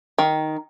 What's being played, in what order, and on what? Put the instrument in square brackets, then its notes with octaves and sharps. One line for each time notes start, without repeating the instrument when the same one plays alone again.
[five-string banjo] D#3